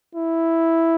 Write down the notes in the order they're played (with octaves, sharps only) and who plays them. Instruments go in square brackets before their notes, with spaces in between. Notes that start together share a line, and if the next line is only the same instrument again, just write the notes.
[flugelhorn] E4